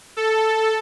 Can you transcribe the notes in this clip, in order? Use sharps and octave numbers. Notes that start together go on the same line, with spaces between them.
A4